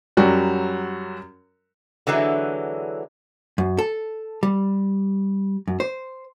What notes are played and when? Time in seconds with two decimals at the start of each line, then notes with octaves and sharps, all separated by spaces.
0.17 F#2 F#3 G3 F#4
2.07 D3 E3 F#3 G#3
3.58 F#2
3.79 A4
4.43 G3
5.68 F#2
5.80 C5